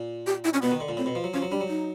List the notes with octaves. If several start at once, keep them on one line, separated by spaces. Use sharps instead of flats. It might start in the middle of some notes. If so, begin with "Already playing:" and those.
Already playing: A#2
G4
E4
C#4
B2 B3
D#3
D3
A#2
A2 C4
B2
F3
F#3
F3 C#4
F#3
G3 D4
F#3
D#4